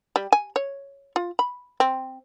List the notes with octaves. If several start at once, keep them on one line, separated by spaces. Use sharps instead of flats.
G3
G#5
C#5
F4
B5
C4